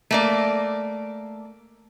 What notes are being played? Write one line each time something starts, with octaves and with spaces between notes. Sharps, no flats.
A3 A#3 D5